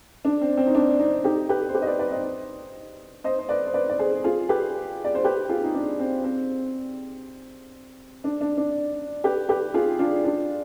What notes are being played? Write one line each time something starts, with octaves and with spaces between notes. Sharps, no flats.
D4
C4
C4
D#4
D4
C4 D#4
D#4 G4
G4 B4
C5
G4 B4
D#5
B4 D5
B4 D5
C5 D#5
C5 D#5
C5
B4 D5
C5
B4 D5
D5
G#4 C5
F4 G#4
G4 B4
D5
C5
G4 B4
F4 G#4
D#4
D4
C4
C4
D4
D4
D4
G4 B4
G4 B4
F4 G#4
D4 F4
D4 F4